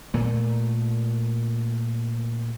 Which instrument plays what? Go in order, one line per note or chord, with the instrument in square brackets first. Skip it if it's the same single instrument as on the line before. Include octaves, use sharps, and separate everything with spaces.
[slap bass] A#2 A3